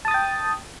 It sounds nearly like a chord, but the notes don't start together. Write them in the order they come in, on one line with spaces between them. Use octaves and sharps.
A5 D#6 A6 G5